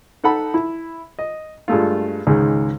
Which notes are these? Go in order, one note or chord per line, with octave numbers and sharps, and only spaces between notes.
D#4 A4 F#5 A5 B5
E4
D#5
G2 G#3 A3 F4
C#2 G#2 D#3 G#3